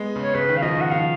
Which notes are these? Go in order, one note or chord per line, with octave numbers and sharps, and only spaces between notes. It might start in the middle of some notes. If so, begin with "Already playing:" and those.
Already playing: G#3 B3
C#3
C#5
C#3 B4
D#3
F5
F3 D#5
D#3 F#5
F3 F5